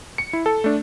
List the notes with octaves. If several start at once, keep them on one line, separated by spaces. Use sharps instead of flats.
C#7
E4
A4
A3 D4